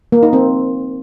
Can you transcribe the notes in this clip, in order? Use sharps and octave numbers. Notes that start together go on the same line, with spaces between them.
A#3
D#4
C4